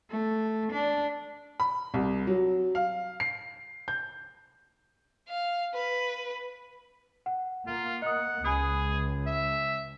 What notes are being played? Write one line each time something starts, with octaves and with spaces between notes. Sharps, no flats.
A3
D4
B5
C2
F#3
F5
C7
G6
F5
B4
F#5
A#3 F4
D#5 F#5 D#6
C#2 G#4 G#5 B5 D#6
E5